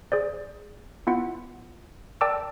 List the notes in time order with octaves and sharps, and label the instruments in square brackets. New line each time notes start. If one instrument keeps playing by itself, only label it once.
[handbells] G#4 C5 D5
B3 E4 F4 F#5
A#4 D5 G5 A5 D6 E6